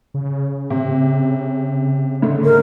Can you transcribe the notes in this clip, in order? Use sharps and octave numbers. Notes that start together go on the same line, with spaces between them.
C#3
C3
G#2 D3 A3
A#4